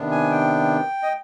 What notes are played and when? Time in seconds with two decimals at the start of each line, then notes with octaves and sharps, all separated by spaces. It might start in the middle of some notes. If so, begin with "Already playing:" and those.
Already playing: C3 D#3 B3 D4
0.11 G#5
0.31 G5
1.03 D#5